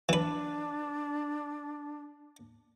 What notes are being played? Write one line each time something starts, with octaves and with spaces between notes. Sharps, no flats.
E3 D4 B4